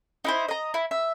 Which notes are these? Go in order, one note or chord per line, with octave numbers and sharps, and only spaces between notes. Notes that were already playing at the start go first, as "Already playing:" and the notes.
D#4 E4 C5
D#5 A#5
E4
E5